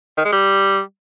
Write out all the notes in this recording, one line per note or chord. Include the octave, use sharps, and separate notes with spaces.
D#3
G#3
G3